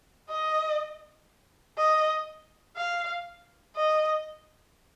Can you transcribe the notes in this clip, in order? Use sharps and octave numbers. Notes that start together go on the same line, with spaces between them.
D#5
D#5
F5
D#5